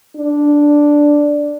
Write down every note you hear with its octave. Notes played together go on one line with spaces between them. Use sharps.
D4